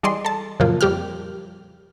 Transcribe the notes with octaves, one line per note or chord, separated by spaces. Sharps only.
E3 G3 G#4 D5 D#5 C6
A4 A5
F#2 A#2 C#3 F3 A#3 F4
F2 G3 G4 G5 F6